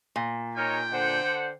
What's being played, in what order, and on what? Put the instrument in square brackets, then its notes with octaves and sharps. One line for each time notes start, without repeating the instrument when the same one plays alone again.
[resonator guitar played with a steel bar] A#2
[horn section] D#4 A#4 C#5 [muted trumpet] G5
[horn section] D3 C5 F#5